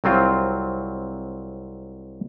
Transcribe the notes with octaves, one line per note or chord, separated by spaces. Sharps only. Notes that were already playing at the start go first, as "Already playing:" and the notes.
C2 F#3 C4 F4